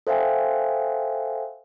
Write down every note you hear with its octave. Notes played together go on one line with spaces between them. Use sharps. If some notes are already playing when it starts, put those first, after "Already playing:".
A4 C5 E5 F5 G5 G#5